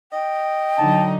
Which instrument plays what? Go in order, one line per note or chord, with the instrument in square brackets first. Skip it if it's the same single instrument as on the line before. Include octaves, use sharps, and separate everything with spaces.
[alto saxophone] D#5 [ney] G5
[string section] D3 F#3 D#4 [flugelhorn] A5